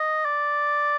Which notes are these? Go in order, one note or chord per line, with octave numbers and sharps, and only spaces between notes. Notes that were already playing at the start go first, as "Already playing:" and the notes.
Already playing: D#5
D5